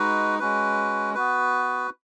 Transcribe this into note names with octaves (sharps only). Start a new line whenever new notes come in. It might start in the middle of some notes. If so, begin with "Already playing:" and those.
Already playing: G#3 D#4 F#4 B4
G#3 C#4 F#4 B4
B3 F#4 B4